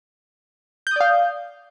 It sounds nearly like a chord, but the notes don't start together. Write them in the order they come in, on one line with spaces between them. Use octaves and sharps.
G6 D#6 D5 F5